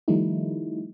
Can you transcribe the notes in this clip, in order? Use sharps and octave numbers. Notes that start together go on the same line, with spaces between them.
D#3 F3 G3 A3 D#4 E4